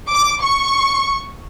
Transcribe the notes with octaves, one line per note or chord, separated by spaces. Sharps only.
D6
C#6